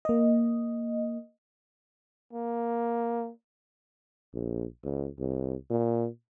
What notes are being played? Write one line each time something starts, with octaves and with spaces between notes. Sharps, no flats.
A#3 D#5
A#3
A#1
C#2
C2
A#2